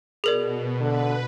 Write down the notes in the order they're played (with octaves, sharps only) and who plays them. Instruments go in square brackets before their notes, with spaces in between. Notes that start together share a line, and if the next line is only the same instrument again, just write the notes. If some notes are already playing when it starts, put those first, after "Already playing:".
[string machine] B2 [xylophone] G#4 A#4 D5
[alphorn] D3 [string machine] B4